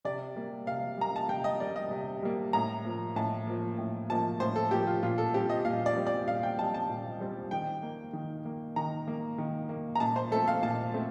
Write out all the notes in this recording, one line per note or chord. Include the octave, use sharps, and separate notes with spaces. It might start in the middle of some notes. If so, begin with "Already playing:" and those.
C3 D5
G3 A#3
C3 F5
G3 A#3 A#5
A5
C3 G5
D#5
G3 A#3 D5
D#5
C3
G3 A#3
A2 A#5
F3 A#3
A2 A5
F3 A#3
A2
F3 A#3 A5
A2 C5
A4
F3 A#3 G4
F4
A#2 F4
A4
G3 C4 G4
D#5
A#2 F5
D5
G3 C4
D5
A#2 F5
G5
G3 C4 A5
A5
A#2
G3 C4
D#3 G5
A#3
D#3
A#3
D#3 A#5
A#3
D#3
A#3
A#5
A#2 A5
C5
A3 C4 A4
F5
A#2 A5
A3 C4